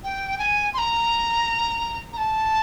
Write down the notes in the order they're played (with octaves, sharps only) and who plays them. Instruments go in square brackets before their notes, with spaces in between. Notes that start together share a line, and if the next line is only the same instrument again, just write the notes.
[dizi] G5
G#5
C6
A#5
A#5
A5